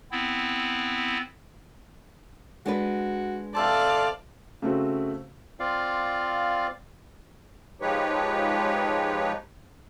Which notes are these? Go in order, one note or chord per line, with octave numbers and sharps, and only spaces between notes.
B3 C4 E4
G#3 D4 F#4 B4
C3 A4 C5 D5 F5 A5
C#3 A3 C4 F#4
C4 F4 D5 F5
F3 G#3 D#4 G4 B4 C#5